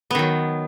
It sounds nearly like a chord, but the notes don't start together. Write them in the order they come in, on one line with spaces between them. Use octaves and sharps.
B3 D#3 F#3